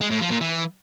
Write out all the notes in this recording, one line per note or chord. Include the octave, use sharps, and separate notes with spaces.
G#3
A2
F3
A#2
E3